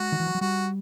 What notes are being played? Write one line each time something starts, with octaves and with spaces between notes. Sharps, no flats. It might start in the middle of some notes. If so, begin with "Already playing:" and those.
Already playing: G#3 F#4
D#3
E3
F3
F#3
G3 F#4